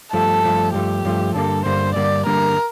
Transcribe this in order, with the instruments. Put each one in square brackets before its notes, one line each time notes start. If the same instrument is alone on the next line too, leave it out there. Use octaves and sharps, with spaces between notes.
[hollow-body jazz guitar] G2 F3 A3 [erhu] A4
[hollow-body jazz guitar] G2 F3 A3
[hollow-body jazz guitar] G2 F3 A3 [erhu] G4
[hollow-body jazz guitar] G2 F3 A3
[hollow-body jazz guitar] G2 D3 G3 A#3 [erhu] A4
[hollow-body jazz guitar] G2 D3 G3 A#3 [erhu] C5
[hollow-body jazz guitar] G2 D3 G3 A#3 [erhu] D5
[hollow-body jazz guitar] G2 D3 G3 A#3 [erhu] A#4